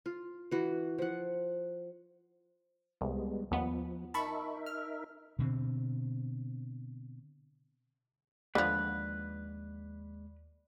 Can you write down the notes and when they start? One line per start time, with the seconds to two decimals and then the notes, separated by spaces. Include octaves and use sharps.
0.06 F4
0.51 E3 F#4
0.98 F3 F#5
3.01 C2 G3 G#3 B3
3.51 D#2 F3 B3
4.14 D#4 A#4 E5 A5 B5 C#6
4.66 F6
5.39 B2 D3 C4
8.55 D#2 D3 F3 G#3 B4 D5